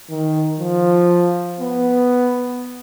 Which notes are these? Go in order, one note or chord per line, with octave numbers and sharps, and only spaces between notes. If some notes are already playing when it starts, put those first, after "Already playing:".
D#3
F3
B3